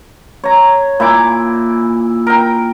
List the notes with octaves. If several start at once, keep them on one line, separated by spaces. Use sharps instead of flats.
C#5 A#5
A#2 E4 G#5 D6
A#4 G5